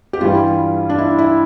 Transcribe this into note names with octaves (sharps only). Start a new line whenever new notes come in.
G4
G2 E3 G3 F4
D4
E4
E4